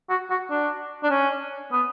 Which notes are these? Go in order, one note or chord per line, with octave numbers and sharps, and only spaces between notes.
F#4
F#4
D4
D4
C#4
B3